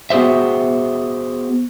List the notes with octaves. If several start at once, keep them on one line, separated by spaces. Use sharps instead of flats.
B3 F#4 G#4 C5 E5